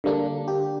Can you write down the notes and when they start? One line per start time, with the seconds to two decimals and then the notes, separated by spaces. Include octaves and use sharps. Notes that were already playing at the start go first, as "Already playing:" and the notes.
0.04 D3 G3 A#3 D4
0.48 G4